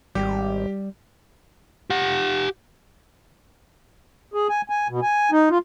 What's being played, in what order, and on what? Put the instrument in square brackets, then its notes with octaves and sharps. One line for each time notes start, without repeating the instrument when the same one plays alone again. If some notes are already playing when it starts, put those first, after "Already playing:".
[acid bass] G#1 [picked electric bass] G3 [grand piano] G4
[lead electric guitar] G4 F#5
[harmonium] G#4
G#5
G#5
B2
G#5
D#4
F4